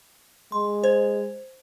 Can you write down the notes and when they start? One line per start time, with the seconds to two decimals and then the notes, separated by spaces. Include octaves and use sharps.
0.52 G#3 C6
0.84 C5 G#6